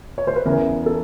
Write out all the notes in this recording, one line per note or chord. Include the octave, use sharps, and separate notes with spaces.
C#5
C5
B4
E2 C#3 E3 A#4
A4